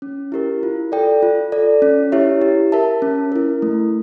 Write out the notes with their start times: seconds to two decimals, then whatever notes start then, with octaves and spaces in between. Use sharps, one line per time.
0.02 C#4
0.32 E4 G4 A#4
0.63 F4
0.92 A4 D5 G5
1.23 F4
1.52 A4 D5
1.82 C#4
2.12 E4 G4 C#5 E5
2.42 G4
2.72 A#4 E5 A5
3.02 C#4
3.32 E4 A#4
3.62 A3